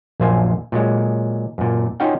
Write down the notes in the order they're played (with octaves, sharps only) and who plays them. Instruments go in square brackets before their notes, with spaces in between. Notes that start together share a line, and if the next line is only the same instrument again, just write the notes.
[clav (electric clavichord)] A#1 F#2 F4 C5 G#5
A#2 F#3 G#3
F#2 A#2
C#4 D#4 F4 F#4 F5 G5